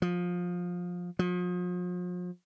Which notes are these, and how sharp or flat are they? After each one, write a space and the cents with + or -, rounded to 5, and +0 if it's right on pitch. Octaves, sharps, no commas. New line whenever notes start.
F3 +20
F3 +40